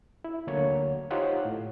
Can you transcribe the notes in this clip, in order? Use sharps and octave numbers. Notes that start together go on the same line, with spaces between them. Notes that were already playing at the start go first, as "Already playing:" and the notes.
E4
D2 D3 F#3 A#3 C#5
D#4 F4 G4 C5 C#5 F#5
A2